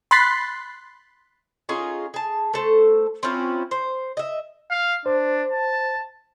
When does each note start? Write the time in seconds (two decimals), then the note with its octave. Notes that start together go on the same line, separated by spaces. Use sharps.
0.11 B5 C6 F#6 A6 B6 C7
1.69 C#4 D#4 F4 G#4
2.14 G#4 A5
2.53 A3 A4 C5
3.23 C4 C#4 E4 F4
3.71 C5
4.17 D#5 E5
4.70 F5
5.06 D4 C5
5.52 A5